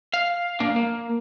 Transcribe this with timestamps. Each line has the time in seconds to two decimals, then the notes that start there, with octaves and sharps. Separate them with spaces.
0.14 F5
0.60 A#3 D4
0.76 A#3